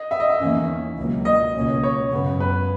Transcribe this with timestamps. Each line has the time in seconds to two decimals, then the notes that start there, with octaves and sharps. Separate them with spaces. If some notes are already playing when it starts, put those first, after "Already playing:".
Already playing: D#5
0.11 E5
0.20 D#5
0.30 E5
0.40 E2 D#3 A#3 C#4
0.98 C#2 B2 F#3 A#3
1.25 D#5
1.55 C#2 B2 A#3 C#4
1.83 C#5
2.11 F#2 C#3 G#3 B3
2.40 B4